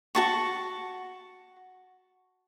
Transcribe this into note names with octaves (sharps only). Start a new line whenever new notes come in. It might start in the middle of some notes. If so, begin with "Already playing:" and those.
F#4 A5 C#6